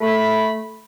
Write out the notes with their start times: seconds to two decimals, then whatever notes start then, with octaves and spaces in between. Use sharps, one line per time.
0.01 A3 B5